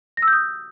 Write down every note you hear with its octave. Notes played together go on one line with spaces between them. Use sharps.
A#6
E6
G6
D#6